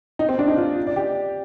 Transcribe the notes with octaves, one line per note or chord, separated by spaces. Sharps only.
D#4
C4
D4
D#4
F4
D5
G4